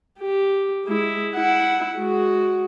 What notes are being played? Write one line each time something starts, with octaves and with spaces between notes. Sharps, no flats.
G4
G#3 E4
E4 F#5
G#3 F#4